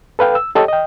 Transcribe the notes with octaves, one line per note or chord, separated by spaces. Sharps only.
A4 B4 F5 G5
E6
G4 A4 C#5 D#5 G5
D#5 G5